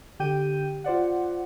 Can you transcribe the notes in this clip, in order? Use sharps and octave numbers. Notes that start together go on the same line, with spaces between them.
D3 G4 G5 G6 D#7
F4 C5 D5 F#5